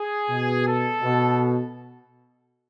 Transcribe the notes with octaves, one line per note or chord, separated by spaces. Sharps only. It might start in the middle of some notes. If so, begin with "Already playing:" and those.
Already playing: G#4
B2
A4
B2